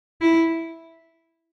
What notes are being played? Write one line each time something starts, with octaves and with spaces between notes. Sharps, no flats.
E4